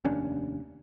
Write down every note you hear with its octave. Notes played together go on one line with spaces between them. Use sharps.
F1 D#2 C#4 D4